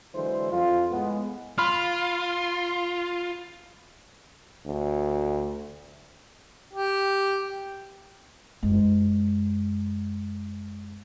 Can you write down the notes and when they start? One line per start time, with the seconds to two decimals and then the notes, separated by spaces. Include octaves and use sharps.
0.15 D3 E3 F#3 G#3 E4 C5
0.52 F2 F4
0.91 A2 G#3 B3
1.58 F4 B5 C6 F6
4.66 D2
6.73 G4
8.63 F#2 G#3